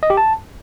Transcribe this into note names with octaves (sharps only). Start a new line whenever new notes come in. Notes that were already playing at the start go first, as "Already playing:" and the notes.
D#5
G4
A5